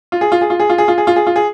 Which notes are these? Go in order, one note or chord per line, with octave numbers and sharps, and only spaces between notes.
F4
G#4
F4
G#4
F4
G#4
F4
G#4
F4
G#4
F4
G#4
F4
G#4